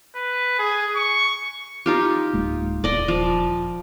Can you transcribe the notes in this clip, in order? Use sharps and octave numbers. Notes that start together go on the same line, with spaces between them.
B4
G#4
C#6
D#4 F4 G4
D1 G#3 A#3
D#1 D5 D#5
F3